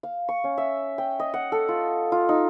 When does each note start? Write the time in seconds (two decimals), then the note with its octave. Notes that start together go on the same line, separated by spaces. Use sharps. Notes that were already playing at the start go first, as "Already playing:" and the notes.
0.03 F5
0.29 C#6
0.44 C#4
0.58 E5
0.98 G5
1.20 D#5
1.34 F#5
1.52 A4
1.69 F4
2.12 F4
2.29 D#4